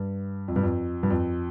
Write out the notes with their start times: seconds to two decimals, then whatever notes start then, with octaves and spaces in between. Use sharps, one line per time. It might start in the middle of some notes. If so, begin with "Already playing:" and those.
Already playing: G2
0.48 F2
0.56 G2
0.63 F2
1.03 G2
1.10 F2